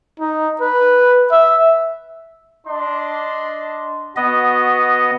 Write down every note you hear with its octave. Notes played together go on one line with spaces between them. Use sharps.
D#4
B4
E5
D4 D#5 C6
B3 F#4 D#5